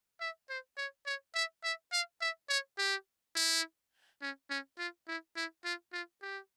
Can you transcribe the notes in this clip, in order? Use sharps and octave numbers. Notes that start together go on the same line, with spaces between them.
E5
C5
C#5
C#5
E5
E5
F5
E5
C#5
G4
E4
C#4
C#4
F4
E4
E4
F4
F4
G4